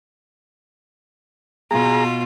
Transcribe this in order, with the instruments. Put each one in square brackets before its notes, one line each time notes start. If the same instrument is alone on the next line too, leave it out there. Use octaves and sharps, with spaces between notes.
[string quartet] B2 F4 [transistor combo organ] G#4 A#5